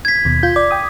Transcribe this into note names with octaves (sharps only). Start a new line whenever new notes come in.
G#6 B6
D#2 B2
F4 G6
D5 D6
G5 D#6